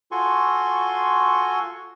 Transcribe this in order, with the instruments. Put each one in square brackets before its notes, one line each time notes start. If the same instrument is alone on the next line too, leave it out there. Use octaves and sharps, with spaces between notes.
[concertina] F4 F#4 A4 G#5 C6 C#6